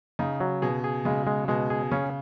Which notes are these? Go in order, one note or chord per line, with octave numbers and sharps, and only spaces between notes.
C#3 D#4
F#3
B2 G#4
G#4
C#3 G#3
G#3
B2 G#3
G#4
C#3 C#4